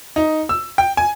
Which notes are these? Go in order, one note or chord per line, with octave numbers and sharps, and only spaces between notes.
D#4
E6
G5
G#5